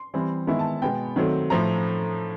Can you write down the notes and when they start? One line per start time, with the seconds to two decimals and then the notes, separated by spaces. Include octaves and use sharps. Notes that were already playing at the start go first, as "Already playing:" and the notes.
Already playing: C6
0.14 E3 G3 C4
0.47 D#3 G#3 B3 E4
0.59 A5
0.82 B2 G#3 B3 G5
1.16 D#3 F#3 A3 C4
1.50 A2 F3 A3 A#5